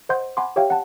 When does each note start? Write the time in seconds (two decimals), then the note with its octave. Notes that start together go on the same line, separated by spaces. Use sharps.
0.09 C5 D#5 F#5 C6 G6
0.37 F#5 G#5 B5 C6 D6
0.56 F4 G4 C#5 E5 F5 G5
0.70 F#5 A5